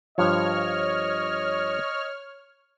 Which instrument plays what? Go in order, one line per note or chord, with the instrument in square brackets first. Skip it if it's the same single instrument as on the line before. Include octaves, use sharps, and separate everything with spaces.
[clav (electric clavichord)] G2 F3 [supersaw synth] C#5 F6 [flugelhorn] D#5